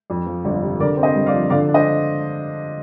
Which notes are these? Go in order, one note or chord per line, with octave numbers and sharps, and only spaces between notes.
F2
F3
G1
C3
D3 A#4 D5
C4
C5 D#5
G2
D5 F5
F3
D3 D5 F5
D4
C5 D#5